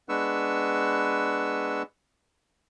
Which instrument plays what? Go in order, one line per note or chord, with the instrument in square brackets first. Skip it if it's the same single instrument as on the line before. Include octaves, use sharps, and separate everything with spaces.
[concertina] G#3 B3 D4 B4 C#6 E6